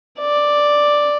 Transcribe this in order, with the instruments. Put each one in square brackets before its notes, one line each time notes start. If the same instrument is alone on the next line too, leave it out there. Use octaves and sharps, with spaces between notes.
[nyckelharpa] D5